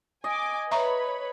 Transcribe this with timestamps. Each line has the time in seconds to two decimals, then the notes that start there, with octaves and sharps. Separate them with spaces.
0.24 D#5 G#5 D6
0.71 B4 C#5 E5 A#5 B5 C#6